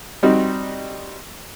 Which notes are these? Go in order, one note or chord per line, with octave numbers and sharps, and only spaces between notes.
G3 C4 D#4 F#4